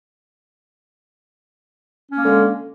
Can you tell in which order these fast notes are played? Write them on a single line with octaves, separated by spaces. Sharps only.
C#4 A#3 G#3 D3